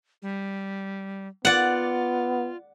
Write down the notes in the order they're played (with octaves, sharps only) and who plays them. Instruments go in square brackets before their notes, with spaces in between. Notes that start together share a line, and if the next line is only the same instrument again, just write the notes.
[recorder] G3
[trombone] B3 [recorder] F4 [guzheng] D5 F#5